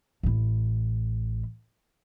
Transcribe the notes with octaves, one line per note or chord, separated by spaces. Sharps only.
A1 E4